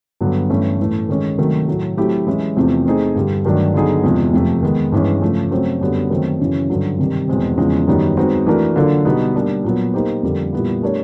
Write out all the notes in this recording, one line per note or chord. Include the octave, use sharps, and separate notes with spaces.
G2 D3 F#3 B3
G2 E3 A3 C#4 E4
A2 E3 A3
D#3 G#3 C#4
C3 D#3 F#3 A3
A2 F#3 A3
F#3 A3 C4 E4 G4
E3 G#3 C#4 E4
E2 C3 F3 A3 C4
A3 C4 D#4 G#4
G2 D3 G3
G2 D#3 F#3 A3 D4
D3 F#3 B3 D#4 G#4
E2 C3 F3 G#3
F2 C3 F3 A3
D#3 G#3 B3
G2 E3 G#3 C#4
C#3 F3 A3
C#3 F#3 A3 C4
F#2 D3 G3 B3
D#3 F#3 A3 C4
F#2 C#3 E3
G2 D3 F#3
C3 D#3 G3
E2 B2 G#3 C4
E2 C#3 F3 G#3
F#2 D#3 G3 B3 D#4
G#3 C4 D#4 F#4 B4
E3 A3 D4 F#4 A#4
D3 F#3 A#3 D4 F4
B2 G3 B3 D#4
G3 A#3 D4
A#2 F#3 B3
A#3 D#4 G4 C5
F2 D3 G3 A#3
A#2 G3 B3 E4
A3 D4 G4 A#4 C#5